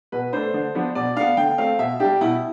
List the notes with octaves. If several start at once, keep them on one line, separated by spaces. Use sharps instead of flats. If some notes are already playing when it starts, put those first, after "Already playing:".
B2 B4
A3 D4 C5
D3
F3 B3 D4
B2 D5
B3 D4 F5
D3 G5
A3 C4 F5
B2 E5
G3 D4 G4
B2 E4